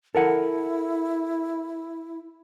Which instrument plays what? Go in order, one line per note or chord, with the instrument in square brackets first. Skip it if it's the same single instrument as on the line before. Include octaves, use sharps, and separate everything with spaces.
[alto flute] E4 [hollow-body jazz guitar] A4 A#4 F#5